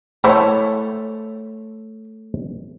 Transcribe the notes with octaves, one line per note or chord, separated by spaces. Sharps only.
G#3 A3 E4 A4 C5 C#5